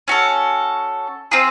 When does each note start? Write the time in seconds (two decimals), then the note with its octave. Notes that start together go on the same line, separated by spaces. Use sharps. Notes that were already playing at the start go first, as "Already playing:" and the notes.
0.08 C#4 F#4 A4
1.31 C4 F4 G#4